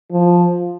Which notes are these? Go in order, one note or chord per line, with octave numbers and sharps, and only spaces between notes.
F3